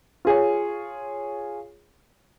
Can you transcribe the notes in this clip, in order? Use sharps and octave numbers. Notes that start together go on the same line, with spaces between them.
F4 G#4 C#5